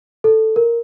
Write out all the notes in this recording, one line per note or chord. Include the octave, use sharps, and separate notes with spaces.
A4
A#4